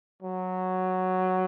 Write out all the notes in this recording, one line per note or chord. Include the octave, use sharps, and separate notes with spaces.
F#3